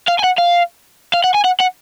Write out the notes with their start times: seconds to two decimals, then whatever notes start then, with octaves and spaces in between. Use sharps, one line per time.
0.08 F5
0.19 G#5
0.24 F#5
0.38 F5
1.14 F5
1.24 F#5
1.34 G#5
1.44 F#5
1.60 F#5